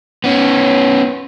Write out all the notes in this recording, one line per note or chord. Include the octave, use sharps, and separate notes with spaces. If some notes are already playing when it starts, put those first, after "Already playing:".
B3 C#4